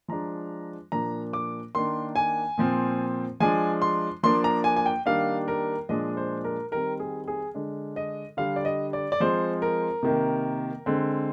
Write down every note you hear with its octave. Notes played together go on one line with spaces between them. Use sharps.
F3 G#3 D4 A#5
A#2 F3 A#3 D4 A#5
D6
D#3 A#3 D4 C6
G#5
A#2 F3 C4
F3 G#3 D4 G#5
C6
F3 A#3 D4 C6
A#5
G#5
G#5
G5
D#3 G3 A#3 D4 F5
A#4
A#2 F3 G#3 D4 D#5
C5
A#4
D#3 G3 C4 A#4
G#4
G#4
D3 G#3 D4
D#5
D3 G3 D4 F5
D5
D#5
D5
D5
F3 G#3 C4 C5
A#4
C3 D#3 A#3
D3 G#3 C4